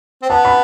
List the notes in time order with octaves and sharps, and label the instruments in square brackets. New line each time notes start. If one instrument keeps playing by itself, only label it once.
[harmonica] C4
[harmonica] B3 [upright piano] A5
[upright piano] B5